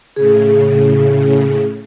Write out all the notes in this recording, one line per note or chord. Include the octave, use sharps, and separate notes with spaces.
A2 C#3 G#4